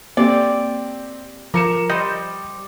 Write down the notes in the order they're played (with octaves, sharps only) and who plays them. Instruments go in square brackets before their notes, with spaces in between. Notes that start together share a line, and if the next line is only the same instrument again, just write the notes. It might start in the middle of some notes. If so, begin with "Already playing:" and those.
[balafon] A#3 [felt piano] C4 G4 [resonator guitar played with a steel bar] D5
[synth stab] F3 [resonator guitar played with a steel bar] A#4 [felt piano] D6 C#7 E7
[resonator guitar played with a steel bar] G3 [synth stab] C5 D#5